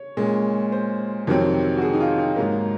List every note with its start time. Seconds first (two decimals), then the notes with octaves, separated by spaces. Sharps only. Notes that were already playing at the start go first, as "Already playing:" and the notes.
Already playing: C#5
0.17 A#2 G#3 C#4
0.72 C5
1.27 F2 C3 D#3 F#3 C4
1.77 F#4
1.81 G#4
1.94 D#4
2.00 F4
2.18 D#4
2.36 G#2 F#3 A#3